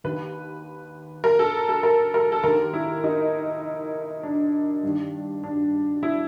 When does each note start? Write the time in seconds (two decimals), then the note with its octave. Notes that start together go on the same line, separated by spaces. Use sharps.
0.04 D#2 D#3 B4
1.24 A#4
1.39 A4
1.69 A4
1.83 A#4
2.14 A#4
2.32 A4
2.43 D#2 D#3 A#4
2.74 E4
3.04 D#4
4.23 D4
4.83 G2 D#3
5.44 D4
6.03 E4